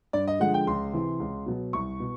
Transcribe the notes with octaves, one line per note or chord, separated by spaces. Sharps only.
G2 D5
D#5
D3 F3 G#3 F#5
G5
C#2 C6
C3 E3
C#2
B2 F#3
C2 C#6
B2